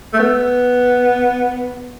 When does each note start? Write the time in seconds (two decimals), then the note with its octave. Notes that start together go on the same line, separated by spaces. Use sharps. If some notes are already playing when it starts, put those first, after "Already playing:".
0.13 A3
0.19 B3